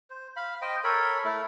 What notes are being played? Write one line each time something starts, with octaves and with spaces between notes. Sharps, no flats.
C5
F5 B5
C5 D#5 G5
A4 A#4 C#5 B5
A3 E4